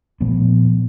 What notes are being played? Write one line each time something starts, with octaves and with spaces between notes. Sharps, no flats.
A#2 F3 A3 B3